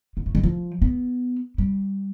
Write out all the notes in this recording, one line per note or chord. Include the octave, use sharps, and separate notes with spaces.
B3
A3
G3
F3
B3
G3